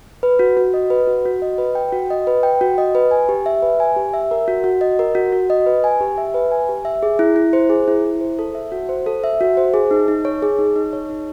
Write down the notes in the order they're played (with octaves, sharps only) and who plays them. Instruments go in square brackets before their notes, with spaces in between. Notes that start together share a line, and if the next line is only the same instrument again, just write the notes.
[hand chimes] B4
F#4
F#4
D#5
B4
F#4
F#4
D#5
B4
G5
F#4
D#5
B4
G5
F#4
D#5
B4
G#5
G4
E5
B4
G#5
G4
E5
A#4
F#4
F#4
D#5
A#4
F#4
F#4
D#5
B4
G#5
G4
E5
B4
G#5
G4
E5
G#4
E4
E4
C5
G#4
E4
E4
C5
A4
E5
F#4
C5
A4
E5
F#4
C5
G#4
D#4
D#4
C#5
G#4
D#4
D#4
C#5
D#4